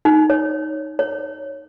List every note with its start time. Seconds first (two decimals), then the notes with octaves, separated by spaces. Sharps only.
0.05 D#4
0.30 C#5
0.99 C#5